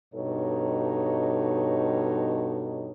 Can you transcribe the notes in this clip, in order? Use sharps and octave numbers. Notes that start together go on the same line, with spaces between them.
G2 B2 D#4 A4 C#5